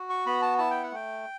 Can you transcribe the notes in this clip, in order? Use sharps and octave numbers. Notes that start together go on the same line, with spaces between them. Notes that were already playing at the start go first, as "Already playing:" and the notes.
Already playing: F#4
C#6
B3 B5
A5
E4 A5
G5
F#5
A3 G5